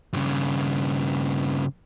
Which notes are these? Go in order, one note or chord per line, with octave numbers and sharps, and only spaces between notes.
G2 C#3